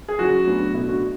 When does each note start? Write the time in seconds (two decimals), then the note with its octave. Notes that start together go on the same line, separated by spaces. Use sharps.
0.08 G#4
0.18 C#3 F#3 C#4 F#4
0.47 A2 F#3 B3 D4
0.74 B2 A3 D4 E4
0.89 F#4